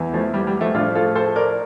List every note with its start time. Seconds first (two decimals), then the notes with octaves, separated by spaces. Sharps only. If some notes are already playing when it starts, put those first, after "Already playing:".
Already playing: E2 E3
0.14 F3 A3
0.34 G3
0.47 G3
0.60 F3 A3
0.74 A2 F3 D4 F4
0.95 F4 A4
1.15 A4 C5
1.36 A#4 D5